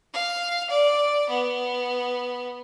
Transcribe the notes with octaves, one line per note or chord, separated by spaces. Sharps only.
F5
D5
B3